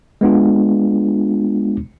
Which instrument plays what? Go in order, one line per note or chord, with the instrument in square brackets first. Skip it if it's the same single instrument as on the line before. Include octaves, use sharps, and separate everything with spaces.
[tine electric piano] G#3 B3 D4 F4